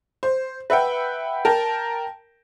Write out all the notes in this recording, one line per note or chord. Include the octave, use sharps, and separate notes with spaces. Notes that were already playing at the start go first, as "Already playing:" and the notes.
C5
B4 E5 F#5 G5
A#4 G5 A5